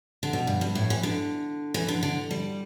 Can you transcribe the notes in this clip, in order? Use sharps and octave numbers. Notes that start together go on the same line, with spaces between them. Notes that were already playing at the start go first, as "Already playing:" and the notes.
D3
B2
G2
G2
A2
E3
D3
E3
D3
D3
G3